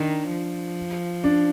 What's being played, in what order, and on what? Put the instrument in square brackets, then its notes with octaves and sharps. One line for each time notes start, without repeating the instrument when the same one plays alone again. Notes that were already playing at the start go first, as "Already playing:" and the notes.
Already playing: [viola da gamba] D#3 [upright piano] D4
[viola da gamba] F3
[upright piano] D4